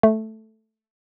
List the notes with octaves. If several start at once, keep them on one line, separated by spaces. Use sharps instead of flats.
A3